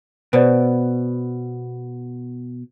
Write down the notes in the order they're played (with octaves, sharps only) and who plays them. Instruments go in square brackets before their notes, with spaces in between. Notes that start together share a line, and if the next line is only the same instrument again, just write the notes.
[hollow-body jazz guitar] B2 [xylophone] B4 C5 D5